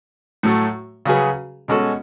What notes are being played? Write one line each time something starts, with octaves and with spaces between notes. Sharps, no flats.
A2 F#3 A3
C#3 F#3 C#4 G#4 B4
B2 G#3 C#4 F#4 A4